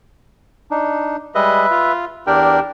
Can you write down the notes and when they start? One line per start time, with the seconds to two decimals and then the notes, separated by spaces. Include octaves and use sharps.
0.71 D4 D#4
1.35 G3 G#3 B4 D#5 E5
1.71 F4
2.27 E2 D4 G4 A#4 G5